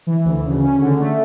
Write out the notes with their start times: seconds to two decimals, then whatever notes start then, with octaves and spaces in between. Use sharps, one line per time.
0.07 E3
0.25 D2
0.44 C#3
0.62 C#4
0.81 D3
1.00 A3